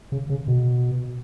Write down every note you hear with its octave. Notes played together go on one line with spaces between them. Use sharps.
C#3
C#3
B2